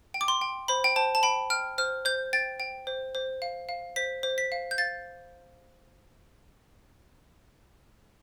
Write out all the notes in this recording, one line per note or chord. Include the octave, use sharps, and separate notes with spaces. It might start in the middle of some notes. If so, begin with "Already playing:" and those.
G5
D6
C6
G5
C5 B5
G5
C5 A5
A5
G5 B5
G5 F6
C5 F6
C5 G6
G5 A6
G5
C5
C5
F5
F5
C5 B6
C5
B6
F5
G6
F5 A6